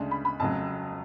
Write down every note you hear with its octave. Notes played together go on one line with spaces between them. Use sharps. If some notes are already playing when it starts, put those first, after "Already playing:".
Already playing: D2 C#3 G#3 D4
B5
B5
F1 F2 C#3 F#3 A5